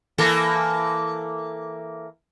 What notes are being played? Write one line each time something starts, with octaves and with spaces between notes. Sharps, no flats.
E3 A#3 A4